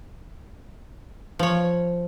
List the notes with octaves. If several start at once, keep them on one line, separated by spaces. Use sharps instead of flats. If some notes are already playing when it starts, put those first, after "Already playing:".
F3 C#5